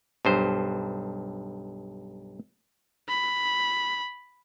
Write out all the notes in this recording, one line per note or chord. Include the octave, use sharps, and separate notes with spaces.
B1 G2 C5
B5